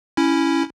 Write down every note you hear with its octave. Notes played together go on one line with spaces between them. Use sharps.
C#4 E4